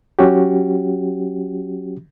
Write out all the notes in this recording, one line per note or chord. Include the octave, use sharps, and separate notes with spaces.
F#3 C#4 F#4 G4